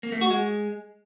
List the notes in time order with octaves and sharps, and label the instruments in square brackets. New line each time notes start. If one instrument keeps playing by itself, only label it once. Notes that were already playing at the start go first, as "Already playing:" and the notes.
[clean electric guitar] A#3
A3
F#4
G#3